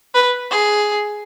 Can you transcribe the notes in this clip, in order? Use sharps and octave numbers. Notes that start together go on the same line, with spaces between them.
B4
G#4